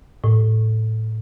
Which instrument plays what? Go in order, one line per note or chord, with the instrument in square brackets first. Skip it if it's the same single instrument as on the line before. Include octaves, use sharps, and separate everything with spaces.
[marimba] A2